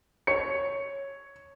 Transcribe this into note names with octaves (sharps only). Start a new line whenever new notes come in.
C#5 C#7